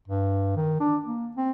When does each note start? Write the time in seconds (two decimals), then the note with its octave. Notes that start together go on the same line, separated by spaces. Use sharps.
0.08 G2
0.56 D#3
0.80 D4
1.05 A#3
1.36 C4